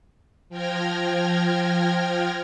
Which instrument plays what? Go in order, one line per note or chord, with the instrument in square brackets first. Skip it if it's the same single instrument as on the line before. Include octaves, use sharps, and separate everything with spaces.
[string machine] F3 G5 F6 G#6 A#6